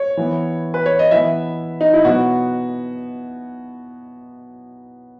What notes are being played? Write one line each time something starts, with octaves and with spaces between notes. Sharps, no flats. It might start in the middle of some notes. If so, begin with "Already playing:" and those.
Already playing: C#5
E3 B3
B4
C#5
D#5
E3 B3 E5
D#4
E4
B2 F#3 B3 F#4